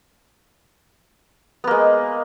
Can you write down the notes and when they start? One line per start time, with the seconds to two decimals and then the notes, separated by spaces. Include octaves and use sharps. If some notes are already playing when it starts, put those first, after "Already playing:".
1.64 B3
1.67 A#3
1.71 G#3